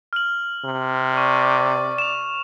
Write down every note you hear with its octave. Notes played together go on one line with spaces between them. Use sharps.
F6 F#7
C3
D5 C#6
E7 F7